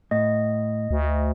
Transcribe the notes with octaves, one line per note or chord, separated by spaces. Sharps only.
A2 D#5
D2